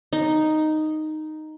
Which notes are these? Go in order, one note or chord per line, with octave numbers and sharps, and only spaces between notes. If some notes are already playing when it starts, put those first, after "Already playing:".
D#4